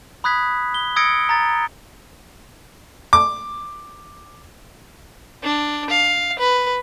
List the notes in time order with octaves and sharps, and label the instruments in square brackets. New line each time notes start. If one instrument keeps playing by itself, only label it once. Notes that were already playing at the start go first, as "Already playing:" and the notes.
[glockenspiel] B5 D#6 F#6 G#6 B6
G7
D#6 E6 G#6 A#6 C#7 D7
A#5 A6
[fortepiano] D6
[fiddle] D4
F5
B4